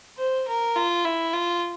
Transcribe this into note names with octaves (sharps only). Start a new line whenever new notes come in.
C5
A#4
F4
E4
F4